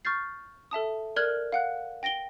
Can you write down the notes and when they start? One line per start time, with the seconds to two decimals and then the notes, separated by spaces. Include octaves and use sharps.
0.05 C#6 F6 G6 A6 C7
0.71 A4 E5 A5 D#6
1.16 A#4 D5 F6 F#6 G#6 F#7
1.52 F5 F#5 F#6
2.03 G5 A#6 D7 G7